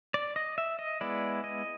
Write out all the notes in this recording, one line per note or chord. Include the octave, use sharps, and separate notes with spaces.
D5
D#5
E5
D#5
G#3 B3 E4 D5
D#5